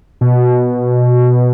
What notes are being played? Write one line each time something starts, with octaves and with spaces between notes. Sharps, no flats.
B2